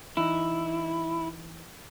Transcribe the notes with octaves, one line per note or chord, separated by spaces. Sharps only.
E3 D#4 E4